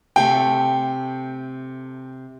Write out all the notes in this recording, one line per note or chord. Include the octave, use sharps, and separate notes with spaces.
C3 A3 G5 C6